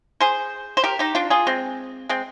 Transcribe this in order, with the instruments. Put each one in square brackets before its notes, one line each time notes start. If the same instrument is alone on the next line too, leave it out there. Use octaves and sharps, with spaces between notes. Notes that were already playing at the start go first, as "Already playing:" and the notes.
[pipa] G#4 C5
C5
G4 A#4
D#4 G4
D4 F4
F4 G#4
G#3 C4
G#3 C4